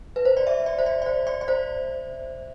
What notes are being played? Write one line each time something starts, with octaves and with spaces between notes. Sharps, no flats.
B4
C5
D5
E5
D5
C5
D5
D5
C5
D5
D5
C5